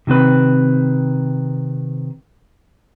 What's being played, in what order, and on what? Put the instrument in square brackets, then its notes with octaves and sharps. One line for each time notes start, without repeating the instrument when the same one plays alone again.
[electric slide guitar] C3 D#3 C4 B4